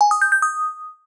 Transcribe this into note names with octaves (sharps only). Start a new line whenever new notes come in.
G#5
D#6
G6
G6
D#6